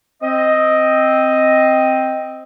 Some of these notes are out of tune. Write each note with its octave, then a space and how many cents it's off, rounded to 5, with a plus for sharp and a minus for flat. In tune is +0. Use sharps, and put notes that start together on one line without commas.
C4 +0 D#5 +5